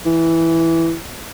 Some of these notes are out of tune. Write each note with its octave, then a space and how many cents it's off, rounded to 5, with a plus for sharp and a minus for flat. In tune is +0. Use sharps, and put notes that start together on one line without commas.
E3 +0